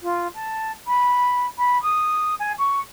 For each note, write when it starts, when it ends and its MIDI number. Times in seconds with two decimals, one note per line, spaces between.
0.02 0.27 65
0.34 0.71 81
0.87 1.46 83
1.58 1.81 83
1.83 2.35 87
2.39 2.52 80
2.58 2.79 85